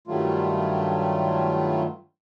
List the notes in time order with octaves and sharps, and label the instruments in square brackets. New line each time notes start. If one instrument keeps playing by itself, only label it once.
[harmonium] G2 D#3 F#3 G3 A3 F4